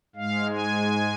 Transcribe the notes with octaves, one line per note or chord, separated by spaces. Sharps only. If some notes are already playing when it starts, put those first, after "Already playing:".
G#2 G#3 F5
G#5